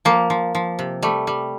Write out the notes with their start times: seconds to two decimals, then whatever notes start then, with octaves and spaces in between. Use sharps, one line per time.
0.05 F3 A#3
0.30 F3
0.55 F3
0.79 C3
1.03 G3 A3
1.27 G3